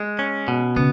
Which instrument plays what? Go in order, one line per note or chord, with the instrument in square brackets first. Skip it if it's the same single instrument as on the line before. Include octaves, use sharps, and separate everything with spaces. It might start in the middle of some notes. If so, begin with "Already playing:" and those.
Already playing: [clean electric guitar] G#3
C#4
B2
[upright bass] C#3 [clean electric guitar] B3